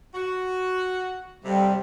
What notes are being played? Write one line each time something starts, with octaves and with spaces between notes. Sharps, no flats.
F#4
F2 C3 G3